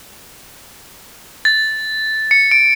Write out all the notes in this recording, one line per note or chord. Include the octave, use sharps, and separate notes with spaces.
A6
C#7
D7